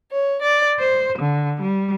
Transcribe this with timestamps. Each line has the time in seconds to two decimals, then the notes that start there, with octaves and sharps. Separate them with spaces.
0.13 C#5
0.42 D5
0.81 C5
1.20 D3
1.62 G3